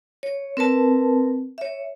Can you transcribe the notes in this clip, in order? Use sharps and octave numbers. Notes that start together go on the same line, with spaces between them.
C#5
C4 A#4 B4 A5
C#5 E5